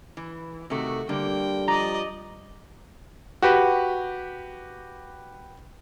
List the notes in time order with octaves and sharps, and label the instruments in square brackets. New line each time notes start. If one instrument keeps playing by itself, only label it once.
[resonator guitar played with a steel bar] E3
[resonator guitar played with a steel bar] C3 D#3 A3 [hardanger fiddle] F#4
[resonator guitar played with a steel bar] D3 A#3 [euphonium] G3 [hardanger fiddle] G5
[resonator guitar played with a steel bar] F3 [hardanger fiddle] D5 D#5 [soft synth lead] A#5
[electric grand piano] F#4 G4 B4